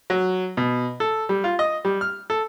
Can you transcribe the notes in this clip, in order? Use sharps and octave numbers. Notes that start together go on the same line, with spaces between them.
F#3
B2
A4
G3
F4
D#5
G3
F6
A4